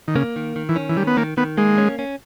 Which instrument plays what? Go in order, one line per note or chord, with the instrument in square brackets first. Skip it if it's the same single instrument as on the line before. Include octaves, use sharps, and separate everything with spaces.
[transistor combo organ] D#3
[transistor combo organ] C#3 [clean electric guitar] A#3
[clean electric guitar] D#3
D#3
[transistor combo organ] E3
[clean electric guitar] C#4
[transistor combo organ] E3
[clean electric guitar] D#3 [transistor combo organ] G3
[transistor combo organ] B3
[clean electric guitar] D#3 [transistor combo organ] A#3
[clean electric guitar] D#3 [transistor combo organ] B3
[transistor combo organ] G#3 [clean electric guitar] A#3
[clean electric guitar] C#4
C#4